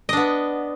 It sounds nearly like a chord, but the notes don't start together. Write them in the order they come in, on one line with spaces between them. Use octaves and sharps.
D#5 D4 B3